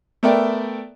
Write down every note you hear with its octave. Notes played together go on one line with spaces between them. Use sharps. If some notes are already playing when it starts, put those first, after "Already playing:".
A3 B3 A#4 D5 E5 G5